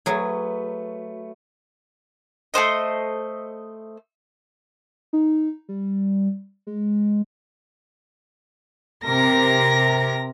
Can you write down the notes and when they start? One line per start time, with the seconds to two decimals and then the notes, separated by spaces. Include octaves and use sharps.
0.06 F#3 A3 G#4 B4
2.54 A3 B3 C5 D#5
5.13 D#4
5.69 G3
6.67 G#3
9.04 C3 A#4 A#6